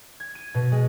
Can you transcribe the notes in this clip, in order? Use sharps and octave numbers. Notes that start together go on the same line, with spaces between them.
G#6
D#7
B2
G#3